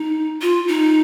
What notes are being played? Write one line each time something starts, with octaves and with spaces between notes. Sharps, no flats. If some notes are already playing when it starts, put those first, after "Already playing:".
Already playing: D#4
F4
D#4